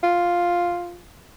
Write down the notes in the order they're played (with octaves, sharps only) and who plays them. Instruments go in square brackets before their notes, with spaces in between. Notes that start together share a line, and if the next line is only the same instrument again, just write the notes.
[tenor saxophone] F4